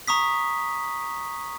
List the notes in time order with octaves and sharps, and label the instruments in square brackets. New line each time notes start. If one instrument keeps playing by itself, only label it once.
[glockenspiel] A#5 C#6 D#6 B6